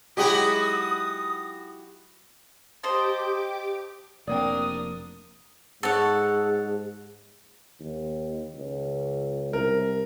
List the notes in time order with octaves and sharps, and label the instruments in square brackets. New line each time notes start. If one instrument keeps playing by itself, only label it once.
[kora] F#3 G#3 D#4 [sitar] E4 F#4 G4 [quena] D#6
[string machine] G4 D6 [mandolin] C5 D#5 A5
[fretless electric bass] F1 A#3 C4 [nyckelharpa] D4 A#4 [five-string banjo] D5 G5 [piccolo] D#6
[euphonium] G#2 [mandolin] F#4 C#5 [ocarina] G#4 [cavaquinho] A4 F#5
[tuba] D#2
C#2
[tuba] C2 [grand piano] A#4